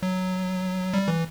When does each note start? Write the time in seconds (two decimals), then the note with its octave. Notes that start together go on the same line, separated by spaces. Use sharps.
0.03 F#3
0.94 G3
1.08 E3